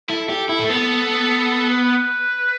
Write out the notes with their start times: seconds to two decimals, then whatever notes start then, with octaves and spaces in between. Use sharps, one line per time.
0.10 E4 A4
0.30 G4
0.49 E4
0.60 A3
0.70 B3
1.69 B4